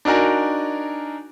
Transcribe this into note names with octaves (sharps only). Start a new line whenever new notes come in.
D4 D#4 F#4 A#4 G#5